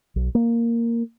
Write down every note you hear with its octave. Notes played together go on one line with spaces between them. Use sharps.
B1
A#3